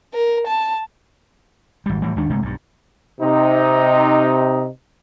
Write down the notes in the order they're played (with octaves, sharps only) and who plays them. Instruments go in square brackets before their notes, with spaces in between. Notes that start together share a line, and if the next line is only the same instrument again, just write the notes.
[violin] A#4
A5
[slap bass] G#1 G3
A2 E3 F#3 G3
D#2 D#3 G#3 D4
G1 C3 G#3 A3
B1 G2
[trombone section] C3 D#4